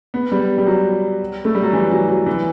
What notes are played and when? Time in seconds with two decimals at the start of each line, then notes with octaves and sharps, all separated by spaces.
0.14 B3
0.32 G3
0.58 G3
0.67 F#3
1.45 A3
1.55 G3
1.63 F#3
1.73 E3
1.91 F#3
2.09 F#3
2.26 E3